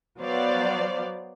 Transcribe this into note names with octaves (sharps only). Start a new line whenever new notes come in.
F#3 B3 C5 D5 F5